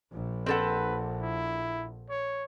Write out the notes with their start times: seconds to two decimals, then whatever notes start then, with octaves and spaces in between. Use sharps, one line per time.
0.13 A#1
0.46 C4 A4 B4 F#5
1.22 E4
2.10 C#5